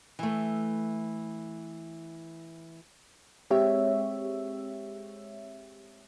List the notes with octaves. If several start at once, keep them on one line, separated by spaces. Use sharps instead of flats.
E3 A3
G#3 C4 G4 C#5 E5